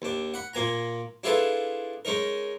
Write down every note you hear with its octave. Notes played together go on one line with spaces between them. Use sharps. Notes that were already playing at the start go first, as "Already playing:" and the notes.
D#2 D4
F#5 B5
A#2 A#3 G#5 A#5
D4 E4 F4 G#4 A4 B4
G#3 C#4 D#4 A#4